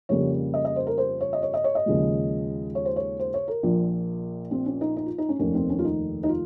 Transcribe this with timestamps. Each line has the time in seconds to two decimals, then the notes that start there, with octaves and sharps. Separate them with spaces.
0.09 F2 C#3 G3 A#3 C#5
0.54 D#5
0.65 D#5
0.76 C5
0.87 A#4
0.98 C5
1.21 C#5
1.33 D#5
1.42 C#5
1.54 D#5
1.64 C#5
1.75 D#5
1.86 D#2 C#3 F3 G#3
2.75 C#5
2.85 C5
2.96 C#5
3.20 C5
3.34 C#5
3.48 A#4
3.63 A#1 A#2 F3
4.51 C4
4.66 C#4
4.81 D#4
4.96 D#4
5.06 F4
5.18 D#4
5.29 C#4
5.39 F1 D#2 D#3 A#3 C#4
5.55 C4
5.70 C#4
5.79 F4
5.85 D#4
6.23 D#4
6.29 F4